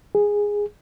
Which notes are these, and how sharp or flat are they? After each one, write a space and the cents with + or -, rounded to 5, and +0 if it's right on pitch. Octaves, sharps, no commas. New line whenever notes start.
G#4 -10